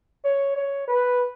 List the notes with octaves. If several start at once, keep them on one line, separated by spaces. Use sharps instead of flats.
C#5
C#5
B4